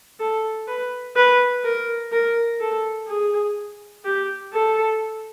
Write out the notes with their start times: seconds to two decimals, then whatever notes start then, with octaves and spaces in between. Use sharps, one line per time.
0.20 A4
0.68 B4
1.16 B4
1.64 A#4
2.12 A#4
2.60 A4
3.08 G#4
4.05 G4
4.53 A4